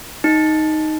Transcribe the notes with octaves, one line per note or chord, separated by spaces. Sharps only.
D#4